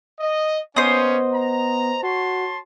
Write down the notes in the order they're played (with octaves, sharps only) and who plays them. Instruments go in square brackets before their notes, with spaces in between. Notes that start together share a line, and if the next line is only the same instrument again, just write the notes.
[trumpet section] D#5
[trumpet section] A#3 C#4 [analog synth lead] B3 [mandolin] C5 D#5 D#6
[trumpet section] A#5
[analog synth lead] F#4 [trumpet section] C#5 A5 C6